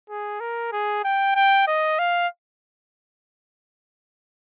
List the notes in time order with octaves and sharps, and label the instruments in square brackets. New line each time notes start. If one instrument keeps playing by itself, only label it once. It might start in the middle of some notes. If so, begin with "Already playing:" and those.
[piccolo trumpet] G#4
A#4
G#4
G5
G5
D#5
F5